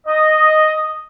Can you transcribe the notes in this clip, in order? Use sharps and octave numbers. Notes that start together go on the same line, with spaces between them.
D#5